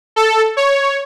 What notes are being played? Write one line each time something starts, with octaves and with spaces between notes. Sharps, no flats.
A4
C#5